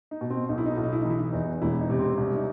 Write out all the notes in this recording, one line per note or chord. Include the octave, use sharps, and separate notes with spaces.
D#4
B2
C4
B1 D#4
E4
D#4
B1 E4
D#4
E4
E3 D#4
E4
D#4
E2
E1 E4
D#4
C3
C4
C2
D#4